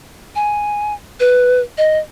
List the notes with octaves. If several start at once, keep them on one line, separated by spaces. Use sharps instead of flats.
G#5
B4
D#5